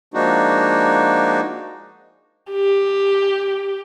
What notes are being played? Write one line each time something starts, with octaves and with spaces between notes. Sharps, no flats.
F3 G#3 A#3 D4 D#4 F#4
G4